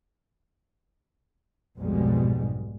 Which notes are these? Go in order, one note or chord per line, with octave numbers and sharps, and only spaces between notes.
B1 F2 G#2 B2 G3 G#3